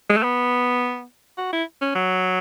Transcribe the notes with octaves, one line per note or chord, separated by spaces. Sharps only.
G#3
A3
B3
F#4
E4
C#4
F#3